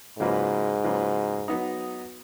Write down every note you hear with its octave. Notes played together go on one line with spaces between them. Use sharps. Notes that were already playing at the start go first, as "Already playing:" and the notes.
G#2 C#3 F#3 A#3 F4 B4
C#3 F#3 A#3 F4 B4
F#3 B3 D#4